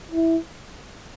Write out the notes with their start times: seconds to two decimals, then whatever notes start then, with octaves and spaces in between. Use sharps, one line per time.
0.11 E4